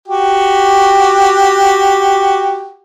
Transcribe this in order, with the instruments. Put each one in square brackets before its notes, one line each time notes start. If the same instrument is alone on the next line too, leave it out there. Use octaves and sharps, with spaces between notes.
[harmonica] F#4 G4